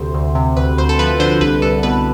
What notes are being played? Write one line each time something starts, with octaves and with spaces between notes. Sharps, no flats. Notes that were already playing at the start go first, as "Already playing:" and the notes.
Already playing: D2 C3 C5
D2
C3
D2 B4
D2 C5
A4
F3 B4
D3 C5
C2 B4
C2 A4
B2 B4